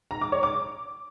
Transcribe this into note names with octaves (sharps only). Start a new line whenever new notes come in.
A#5
D6
C#5
D6